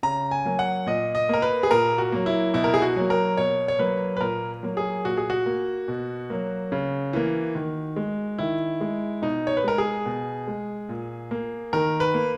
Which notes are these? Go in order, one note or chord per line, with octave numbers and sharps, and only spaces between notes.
C#3 A#5
G#5
F#3 A#3
F#5
A#2 D#5
D#5
A#3 A#4
B4
G#4
A#2 A#4
F#4
F#3 A#3
E4
B2 E4
A#4
G#4
F#4
F#3 A#3
A#4
B2 C#5
C#5
F#3 A#3 B4
B4
A#2 A#4
F#3 A#3
G#4
A#2 F#4
G#4
F#4
A#3
B2
F#3 A#3
C#3
E3 A#3
D#3
G#3
D#3 E4
G#3
B2 D#4
C#5
B4
G#3 A#4
G#4
B2
G#3
A#2
A#3
D#3 A#4
B4
A#3